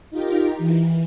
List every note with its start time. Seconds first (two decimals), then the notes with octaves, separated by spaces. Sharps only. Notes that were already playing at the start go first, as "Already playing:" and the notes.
0.11 D#4 F4 G4 A#4
0.58 E3